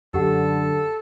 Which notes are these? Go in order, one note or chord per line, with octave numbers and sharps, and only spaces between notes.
F#2 D3 G4 A4 F#5